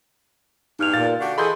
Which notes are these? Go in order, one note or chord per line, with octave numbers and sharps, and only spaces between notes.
E2 G2 D#4 F6 F7
A#2 F5 A6
D3 D4 F#4 G4
E3 G#4 A4 D#5 B5 C6 G6